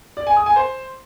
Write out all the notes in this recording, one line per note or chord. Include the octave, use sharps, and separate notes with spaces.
D5
G#5
D#6
G#5
C5